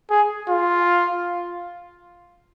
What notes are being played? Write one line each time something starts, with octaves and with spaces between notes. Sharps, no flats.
G#4
F4